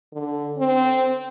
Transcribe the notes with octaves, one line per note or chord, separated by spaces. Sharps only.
D3
C4